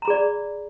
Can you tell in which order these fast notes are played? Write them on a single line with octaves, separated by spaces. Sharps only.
A#5 B5 G#4 D5